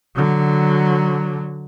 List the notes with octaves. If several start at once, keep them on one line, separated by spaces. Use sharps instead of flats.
D3 F#3